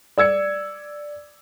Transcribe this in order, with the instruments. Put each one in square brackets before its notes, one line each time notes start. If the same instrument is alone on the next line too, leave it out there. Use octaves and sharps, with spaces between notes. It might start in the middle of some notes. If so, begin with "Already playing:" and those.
[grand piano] D5 E6 G#6 C#7